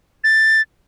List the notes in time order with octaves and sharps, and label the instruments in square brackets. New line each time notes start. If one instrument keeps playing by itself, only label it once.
[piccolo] A6